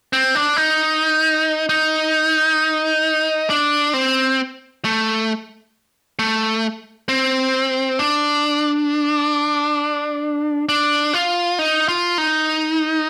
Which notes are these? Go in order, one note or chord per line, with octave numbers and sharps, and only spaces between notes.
C4
D4
D#4
D#4
D4
C4
A3
A3
C4
D4
D4
F4
D#4
F4
D#4